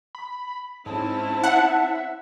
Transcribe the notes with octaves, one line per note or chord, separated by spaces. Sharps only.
B5
G#2 C4 C#4 E4 A5
E5 F#5